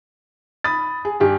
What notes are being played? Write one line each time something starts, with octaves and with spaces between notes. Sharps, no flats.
B5 D#6 A6
G#4
G2 G4 G#4